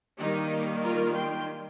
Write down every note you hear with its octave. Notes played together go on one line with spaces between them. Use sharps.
D#3 G3 A#3 D#4 G4
F4 A#4
G5 C6